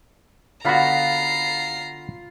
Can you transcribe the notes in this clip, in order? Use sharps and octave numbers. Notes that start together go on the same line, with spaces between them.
D3 B3 F4 F#4 F5 A#5 B5 C7